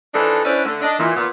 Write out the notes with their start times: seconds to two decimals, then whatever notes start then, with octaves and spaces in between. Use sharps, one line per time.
0.13 E3 F3 D4 D#4 A4
0.44 C#4 D4 E4 B4 C5 D5
0.65 D3 A3
0.82 D4 D#5
0.98 A#2 E3
1.16 A#2 B3